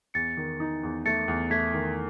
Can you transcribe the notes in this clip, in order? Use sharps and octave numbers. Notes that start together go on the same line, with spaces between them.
E2 A6 C#7
D#3
D#4
E2
A3 A6 C#7
E2
A3 G#6 B6
D#3